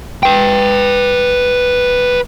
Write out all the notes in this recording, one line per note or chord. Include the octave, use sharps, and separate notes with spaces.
B4 G5